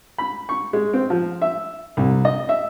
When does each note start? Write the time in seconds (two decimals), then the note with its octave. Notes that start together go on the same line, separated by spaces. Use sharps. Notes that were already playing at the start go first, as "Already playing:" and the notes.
0.18 B5
0.49 C#6
0.73 G#3
0.94 C4
1.10 F3
1.42 E5
1.97 C2
2.25 D#5
2.49 E5